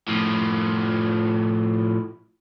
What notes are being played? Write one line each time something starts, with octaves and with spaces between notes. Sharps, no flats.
A2 F3